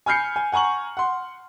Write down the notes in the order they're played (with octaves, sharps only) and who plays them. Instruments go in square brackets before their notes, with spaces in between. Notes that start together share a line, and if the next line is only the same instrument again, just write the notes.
[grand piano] G#5 B5 F6 G6 C7 C#7
G#5
F#5 G#5 A#5 C#6 F#7
F#5 C6